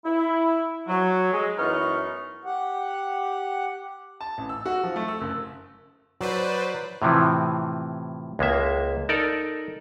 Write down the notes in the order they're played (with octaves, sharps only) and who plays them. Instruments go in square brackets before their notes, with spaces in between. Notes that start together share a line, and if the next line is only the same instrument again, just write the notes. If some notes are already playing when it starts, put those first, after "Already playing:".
[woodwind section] E4
F#3
G#3
F#2 E3 B3 D#4 C#6 F6
[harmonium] G4 F#5
[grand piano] A5
A1
E6
F#4
F3
A3
E6
F#1
[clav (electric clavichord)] F#3 [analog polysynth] B4 C5 D5
[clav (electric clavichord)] A2 C3 E3 F3
C#2 G#3 A#3 E5
D#4 A4 A#4 D5